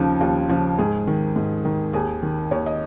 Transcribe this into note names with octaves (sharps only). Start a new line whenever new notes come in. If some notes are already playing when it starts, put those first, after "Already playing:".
Already playing: D#2 C#3 F3 D#4
D#2 F4
C#3 F3
G#2 G#4
D#3
G#2
D#3
D#2 G#4
D#3
D#2 C#5
D#5